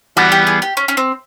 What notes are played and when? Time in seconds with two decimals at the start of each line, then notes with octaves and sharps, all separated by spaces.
0.16 E3 G3 B3 F#4
0.32 G4
0.47 G#4
0.62 G4
0.77 C#4
0.88 C#4
0.97 C4